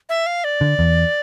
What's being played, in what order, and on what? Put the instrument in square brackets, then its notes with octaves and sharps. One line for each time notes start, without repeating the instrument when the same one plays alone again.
[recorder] E5
F5
D5
[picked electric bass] D3
E2